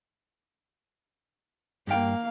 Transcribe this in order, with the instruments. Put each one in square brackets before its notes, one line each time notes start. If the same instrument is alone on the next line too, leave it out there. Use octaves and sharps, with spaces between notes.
[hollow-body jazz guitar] G2 G5 [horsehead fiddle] A#3 F5